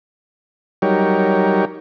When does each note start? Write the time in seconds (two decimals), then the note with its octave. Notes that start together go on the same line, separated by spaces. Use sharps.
0.82 F#3 G3 D#4 G4 A#4 C#5